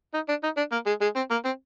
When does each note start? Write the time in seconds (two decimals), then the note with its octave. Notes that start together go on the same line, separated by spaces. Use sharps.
0.14 D#4
0.28 D4
0.43 D#4
0.57 D4
0.72 A#3
0.87 G#3
1.01 G#3
1.16 C4
1.31 A#3
1.45 C4